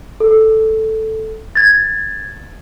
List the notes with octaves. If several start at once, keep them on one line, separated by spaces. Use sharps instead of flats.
A4
G#6 A6